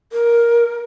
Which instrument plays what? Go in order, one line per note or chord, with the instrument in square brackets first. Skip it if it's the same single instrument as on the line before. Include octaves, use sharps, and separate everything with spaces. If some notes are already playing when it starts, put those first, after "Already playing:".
[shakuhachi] A#4